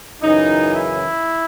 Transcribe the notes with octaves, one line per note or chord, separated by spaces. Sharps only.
F#2 C#3 E3 D#4
E4